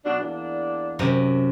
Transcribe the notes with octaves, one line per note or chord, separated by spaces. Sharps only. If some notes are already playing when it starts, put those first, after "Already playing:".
B2 F#3 D4
E2 A#3 D4
F#2 C3